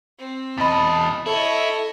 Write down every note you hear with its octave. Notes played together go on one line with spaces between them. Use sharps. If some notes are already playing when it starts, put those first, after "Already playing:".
C4
E2 D#5 A5 B5 D6
E4 A4 C#5 D#5